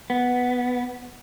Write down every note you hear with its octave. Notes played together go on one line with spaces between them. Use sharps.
B3